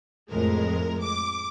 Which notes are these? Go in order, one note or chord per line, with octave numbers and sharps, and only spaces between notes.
F2 A2 G#3 A#4
D6